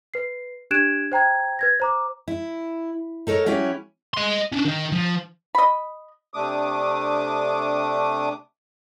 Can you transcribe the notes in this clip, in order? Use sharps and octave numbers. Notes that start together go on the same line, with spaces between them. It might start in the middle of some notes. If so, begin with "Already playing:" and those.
B4 C7
D4 G4 F#6 G#6 D7 E7
C5 G5 A#5 G#6
B4 G#6 A#6
C5 A#5 D6
E4
D#4 A4 A#4 C#5
F#3 C#4 E4 G4 C#5
D#5 C6
C#4 D4
D#3 D#4
F3
D#5 B5
C3 A3 D4 D6 D#6